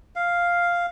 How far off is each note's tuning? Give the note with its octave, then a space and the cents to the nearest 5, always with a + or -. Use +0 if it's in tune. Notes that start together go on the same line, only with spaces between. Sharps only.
F5 +0